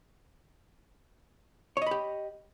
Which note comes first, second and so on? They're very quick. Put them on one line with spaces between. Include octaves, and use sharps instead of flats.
C#5 D#5 B5 G4